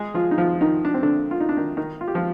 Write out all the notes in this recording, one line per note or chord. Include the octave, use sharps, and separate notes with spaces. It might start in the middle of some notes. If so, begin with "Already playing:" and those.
Already playing: G#3 G#4
F3 F4
D#4
F3 F4
D#3 D#4
D4
C4
D3 D4
F4
D#4
D4
D#3 D#4
D#3 D#4
F4
G4
F3 F4